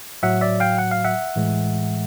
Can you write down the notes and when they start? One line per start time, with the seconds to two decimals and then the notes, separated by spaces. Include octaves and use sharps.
0.23 A2 F#3 E5 F#5
0.41 D5 E5
0.60 F5 G5
0.79 F#5
0.91 F5
1.04 E5 F#5
1.36 A2 E3 G#3